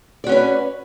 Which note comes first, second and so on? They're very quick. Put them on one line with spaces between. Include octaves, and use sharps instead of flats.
D5 F#4 C#4 B4